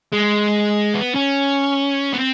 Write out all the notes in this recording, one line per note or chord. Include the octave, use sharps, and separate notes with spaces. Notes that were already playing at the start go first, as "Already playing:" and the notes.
G#3
B3
C#4
B3
C4